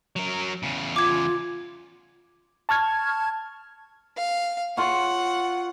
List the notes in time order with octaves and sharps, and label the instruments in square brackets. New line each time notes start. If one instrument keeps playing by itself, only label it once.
[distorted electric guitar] F#3 A#4
E2 C#3
[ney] F4 [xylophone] D6 G#6
[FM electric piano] A5 C#6 F6 G#6
[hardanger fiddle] F5
[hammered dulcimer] F4 C#5 [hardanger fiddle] F#5